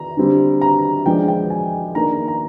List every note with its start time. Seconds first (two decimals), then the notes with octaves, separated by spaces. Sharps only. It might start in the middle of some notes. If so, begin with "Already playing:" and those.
Already playing: A#5
0.17 D3 G3 C4
0.61 A#5
1.06 F3 G#3 D4 G5
1.28 G5
1.50 G#5
1.95 D#3 A#3 D4 A#5
2.28 A#5